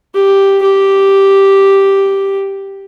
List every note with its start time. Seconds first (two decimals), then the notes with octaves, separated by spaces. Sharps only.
0.15 G4
0.62 G4